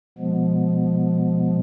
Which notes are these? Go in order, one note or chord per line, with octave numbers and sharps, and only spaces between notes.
B2 F3 G#3 B3